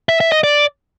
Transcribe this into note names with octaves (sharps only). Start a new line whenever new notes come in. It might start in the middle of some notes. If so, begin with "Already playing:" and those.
E5
E5
D#5
D5